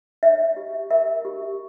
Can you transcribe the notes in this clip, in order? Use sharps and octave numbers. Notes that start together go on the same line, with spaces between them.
C#5 E5
G4
A#4 E5
G4